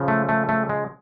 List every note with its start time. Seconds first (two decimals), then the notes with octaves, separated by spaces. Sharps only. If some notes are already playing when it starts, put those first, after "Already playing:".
Already playing: C#3 F3
0.08 A3
0.29 A3
0.49 A3
0.69 G#3